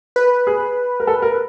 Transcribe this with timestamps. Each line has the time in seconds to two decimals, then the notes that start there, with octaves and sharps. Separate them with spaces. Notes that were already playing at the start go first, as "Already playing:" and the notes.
0.16 B4
0.47 G#4
1.00 A#4
1.07 A4
1.22 A#4